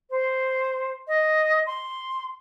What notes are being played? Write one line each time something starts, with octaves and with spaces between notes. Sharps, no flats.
C5
D#5
C6